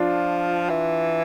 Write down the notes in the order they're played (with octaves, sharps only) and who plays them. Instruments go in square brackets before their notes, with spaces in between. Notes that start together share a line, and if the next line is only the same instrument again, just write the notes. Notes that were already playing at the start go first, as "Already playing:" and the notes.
Already playing: [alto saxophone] F3 [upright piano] D4 F4
[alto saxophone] E3